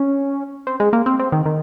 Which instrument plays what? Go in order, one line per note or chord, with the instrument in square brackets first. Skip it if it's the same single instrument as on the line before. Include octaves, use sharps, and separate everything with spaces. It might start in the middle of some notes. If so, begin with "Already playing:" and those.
Already playing: [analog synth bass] C#4
C4
G#3
A#3
C4
C4
D#3
D#3